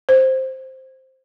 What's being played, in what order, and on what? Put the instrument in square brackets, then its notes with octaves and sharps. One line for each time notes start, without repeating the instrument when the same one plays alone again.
[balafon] C5